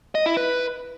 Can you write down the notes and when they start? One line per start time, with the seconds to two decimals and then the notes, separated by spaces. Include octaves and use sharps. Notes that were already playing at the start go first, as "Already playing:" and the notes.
0.15 D#5
0.26 E4
0.37 B4